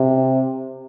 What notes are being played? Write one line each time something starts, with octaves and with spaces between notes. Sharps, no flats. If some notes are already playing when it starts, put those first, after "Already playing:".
Already playing: C3